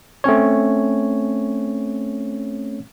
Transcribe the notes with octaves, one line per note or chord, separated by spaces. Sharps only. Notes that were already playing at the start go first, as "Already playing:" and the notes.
A3 C4 C#4 C#5